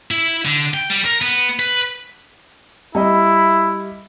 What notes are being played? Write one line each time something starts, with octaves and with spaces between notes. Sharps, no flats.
E4
D3
G5
G3
A#4
B3
B4
G3 E4 D#5